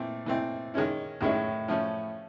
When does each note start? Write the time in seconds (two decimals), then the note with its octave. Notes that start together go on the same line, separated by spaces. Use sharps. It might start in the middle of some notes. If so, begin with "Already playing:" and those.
Already playing: A#2 E3 A3 C4
0.26 E3 A3 C4
0.74 D#3 G#3 C#4 E4
1.21 A2 D#3 G#3 C#4 E4
1.68 F3 A3 C#4